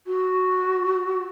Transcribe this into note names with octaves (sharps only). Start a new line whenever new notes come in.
F#4